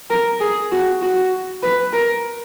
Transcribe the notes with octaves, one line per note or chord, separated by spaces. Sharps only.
A#4
G#4
F#4
F#4
B4
A#4